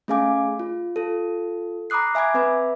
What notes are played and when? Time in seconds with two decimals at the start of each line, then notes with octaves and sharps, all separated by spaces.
0.08 A3 C#4 G#4 F5 G#5 D6
0.60 F4
0.96 F4 A4
1.90 A#5 B5 D6 D#6 F#6 C7
2.15 E5 G#5 B5 D6 G#6
2.34 C4 B4 E5 B5